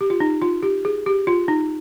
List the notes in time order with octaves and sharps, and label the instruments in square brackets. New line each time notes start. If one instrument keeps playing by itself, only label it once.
[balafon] G4
F4
D#4
F4
G4
G#4
G4
F4
D#4